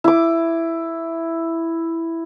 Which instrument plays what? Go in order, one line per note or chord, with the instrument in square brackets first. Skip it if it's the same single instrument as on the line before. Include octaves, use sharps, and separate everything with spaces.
[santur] E4 D6